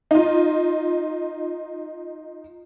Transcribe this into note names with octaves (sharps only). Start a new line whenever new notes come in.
D#4 F4